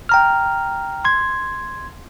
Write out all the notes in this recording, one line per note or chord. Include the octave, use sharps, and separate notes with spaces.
G5 A#5 F6
C6 G#6